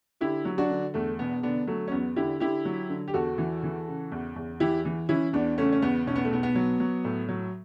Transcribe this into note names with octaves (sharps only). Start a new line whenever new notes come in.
D3 E4 G4
F#3
D4 F#4
D3
E2 A3
E1 B3
D3 B3 D4
F#3 A3
C#4
E2 B3
D3 E4 G4
D3 E4 G4
F#3
D3
G4
E2 F#4 A4
E3
E3
C#3
E2
E2
E3 E4 G4
E3
E3 C#4 E4
E2 B3 D4
C#3 A3 C#4
C#4
E2 B3
B1 C#4
B3
A3
B1 B3
B3
F#3
F#3
A2
F#3